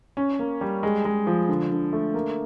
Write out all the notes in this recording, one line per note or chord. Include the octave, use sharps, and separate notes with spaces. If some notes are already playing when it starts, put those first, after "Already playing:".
C#4
A#3
G3
G#3
G#3
F3
D3
D3
A3
A#3